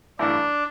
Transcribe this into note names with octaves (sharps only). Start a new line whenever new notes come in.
A1 G2 E3 A3 D4 E4